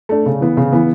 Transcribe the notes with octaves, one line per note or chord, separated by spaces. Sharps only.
A3 D4
C#3
E3 B3
C#3
E3 B3